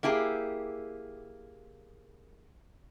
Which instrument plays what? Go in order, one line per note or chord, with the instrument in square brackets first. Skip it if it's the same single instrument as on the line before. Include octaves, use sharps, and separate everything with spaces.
[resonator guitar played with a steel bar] A#3 E4 G4 G#4